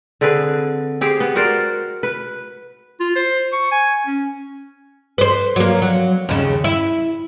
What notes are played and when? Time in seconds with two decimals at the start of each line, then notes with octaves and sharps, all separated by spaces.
0.21 D3 C4 G#4 B4
1.01 C4 G4 G#4 C5
1.20 B3
1.36 F#4 A#4 C5 D5
2.03 B4
3.00 F4
3.16 C5
3.52 C#6
3.72 G#5
4.07 C#4
5.18 B4 C5
5.56 F#3 A#3
5.82 F#3
6.29 D#2 C#3
6.64 E4